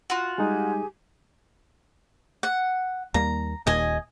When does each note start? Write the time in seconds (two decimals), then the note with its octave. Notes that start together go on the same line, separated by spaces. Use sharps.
0.10 F4 F#4
0.38 G3 G#3 D#4 G4 G#4 G#5
2.43 F#5
3.14 D#2 G3 A#3 A#5
3.67 D#1 D#2 A#2 D#5 G#5